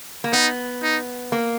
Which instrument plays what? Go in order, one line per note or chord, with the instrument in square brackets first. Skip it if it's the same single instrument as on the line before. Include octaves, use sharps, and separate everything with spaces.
[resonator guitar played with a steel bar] A#3
[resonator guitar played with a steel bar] B3 [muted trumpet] D#4
[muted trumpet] D#4
[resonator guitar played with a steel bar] A#3